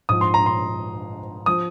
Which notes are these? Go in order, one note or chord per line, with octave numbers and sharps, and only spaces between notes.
G#2 F3 D#6
C6
A#5
C6
F3 D#6